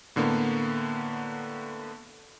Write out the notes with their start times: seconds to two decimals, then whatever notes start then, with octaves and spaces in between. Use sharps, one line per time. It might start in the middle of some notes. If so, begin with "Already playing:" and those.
0.16 A2 D3 A#3 B3